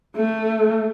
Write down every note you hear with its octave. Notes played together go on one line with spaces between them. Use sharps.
A3